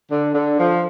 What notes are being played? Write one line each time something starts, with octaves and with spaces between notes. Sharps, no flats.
D3
D3
F3